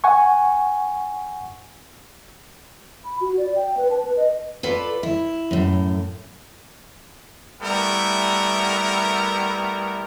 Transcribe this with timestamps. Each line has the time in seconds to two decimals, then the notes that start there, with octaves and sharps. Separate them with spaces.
0.04 F#5 G#5 C#6
3.05 B5
3.21 F#4
3.38 D5
3.56 G5
3.77 B4
3.91 A5
4.05 B4
4.17 D#5
4.63 F4 A4 B4 D5
5.03 E4
5.51 F#2 A2
7.62 G3 A3 B3 E4 A#4